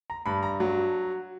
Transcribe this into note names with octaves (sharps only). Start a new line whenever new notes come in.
A#5
G2 B5
A#5
F#3